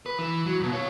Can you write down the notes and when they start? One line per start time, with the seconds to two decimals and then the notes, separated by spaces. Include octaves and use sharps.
0.06 B4
0.19 E3
0.46 F#3
0.60 F#2 B2
0.72 F4 C#5